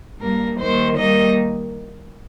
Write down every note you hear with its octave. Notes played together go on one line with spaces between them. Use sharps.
G2 G3 A#3 A#4
D#2 D#3 G3 C5
D#2 D#3 G3 A#3 D#5